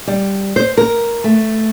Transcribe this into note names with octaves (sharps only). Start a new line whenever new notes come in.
G3
C5
A#4
A3